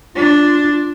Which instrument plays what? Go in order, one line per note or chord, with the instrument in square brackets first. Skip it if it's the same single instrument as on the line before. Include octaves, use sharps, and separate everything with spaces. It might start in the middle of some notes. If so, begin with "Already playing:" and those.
[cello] D4 [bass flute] F4